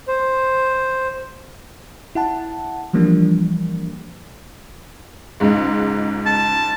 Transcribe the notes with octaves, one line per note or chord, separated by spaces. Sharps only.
C5
E4 F#5 A5
E3 F3 G3 A#3 D4
C#2 G#2 G#3
A5